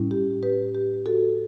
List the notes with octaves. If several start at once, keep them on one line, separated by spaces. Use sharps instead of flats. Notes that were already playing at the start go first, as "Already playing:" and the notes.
Already playing: A2 G3 C#4 E4
G4
G4 B4
G4
F#4 A4